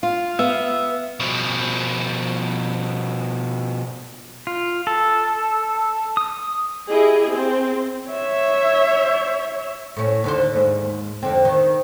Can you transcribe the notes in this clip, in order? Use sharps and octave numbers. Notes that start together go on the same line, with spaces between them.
F4 F5
B3 E5
B2 F3
F4
A4
D#6
E4 G4 G#4 D#5
C4 C5
C#5 E5
A2 C#4
D#2 D3 C5
D#2 G#2
F2 D3 C4
D#3